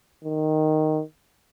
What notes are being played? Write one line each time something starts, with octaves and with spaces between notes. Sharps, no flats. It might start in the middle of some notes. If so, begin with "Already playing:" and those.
D#3